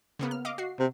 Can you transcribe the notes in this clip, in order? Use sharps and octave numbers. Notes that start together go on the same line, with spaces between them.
C#3 A#3 B3
F6
D#5 F5 D6
F#4 C7
C3